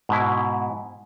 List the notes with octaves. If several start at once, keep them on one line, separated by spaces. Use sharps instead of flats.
G#2 B2 E4